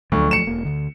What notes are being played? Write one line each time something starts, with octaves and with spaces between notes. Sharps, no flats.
D2 F3 F#3 A3
C#7 E7
E1 A#3
D2 D3